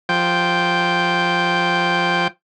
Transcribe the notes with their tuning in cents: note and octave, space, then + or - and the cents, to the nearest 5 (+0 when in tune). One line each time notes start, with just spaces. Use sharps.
F3 +0 G5 +0